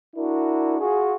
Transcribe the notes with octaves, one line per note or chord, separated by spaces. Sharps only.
D4 E4 F#4 A#4
F4 F#4 G#4